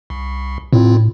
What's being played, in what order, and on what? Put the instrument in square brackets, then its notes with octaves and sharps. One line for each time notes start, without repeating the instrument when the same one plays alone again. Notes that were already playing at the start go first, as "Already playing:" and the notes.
[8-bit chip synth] C2
[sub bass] A2 [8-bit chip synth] C4 E4 F4